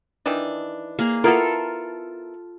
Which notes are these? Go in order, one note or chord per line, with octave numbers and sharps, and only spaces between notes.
D#3 E3 D4
A#3 G#4
B3 E4 F4 A4 A#4